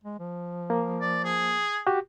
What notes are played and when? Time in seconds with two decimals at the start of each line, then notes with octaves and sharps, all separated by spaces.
0.04 G#3
0.19 F3
0.70 A#3
1.01 D5
1.25 G#4
1.87 F#4 G4